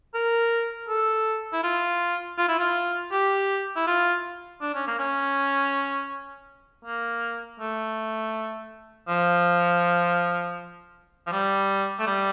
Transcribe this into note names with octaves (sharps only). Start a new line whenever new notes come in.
A#4
A4
E4
F4
F4
E4
F4
G4
E4
F4
D4
C#4
A#3
C#4
A#3
A3
F3
F3
G3
A3
G3